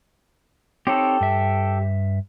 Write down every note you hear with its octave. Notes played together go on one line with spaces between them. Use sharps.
C4 D#4 G4 A4 C#5
G2 E5